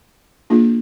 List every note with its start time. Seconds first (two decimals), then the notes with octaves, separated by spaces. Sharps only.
0.50 A#3 D4 F4 G#4